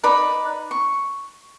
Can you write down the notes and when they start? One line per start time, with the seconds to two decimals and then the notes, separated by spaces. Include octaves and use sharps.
0.04 D#4 B4 D5 B5
0.71 C#6